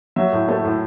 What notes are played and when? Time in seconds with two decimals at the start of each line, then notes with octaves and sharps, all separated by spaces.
0.16 F#3 E5
0.32 A2
0.48 A3
0.65 A2